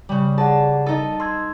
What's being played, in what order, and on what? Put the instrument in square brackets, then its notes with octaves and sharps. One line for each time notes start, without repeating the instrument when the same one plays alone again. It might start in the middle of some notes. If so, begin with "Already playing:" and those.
[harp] C#3 G3
[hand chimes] G#4 D5 F#5 [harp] A5
[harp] D#4 A4 [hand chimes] D#5 A5
[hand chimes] C6 E6 G#6